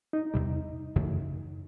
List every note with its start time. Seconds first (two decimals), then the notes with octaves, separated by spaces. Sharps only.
0.13 D#4
0.34 E2 C3 E3 G3
0.96 F#2 C#3 E3 A3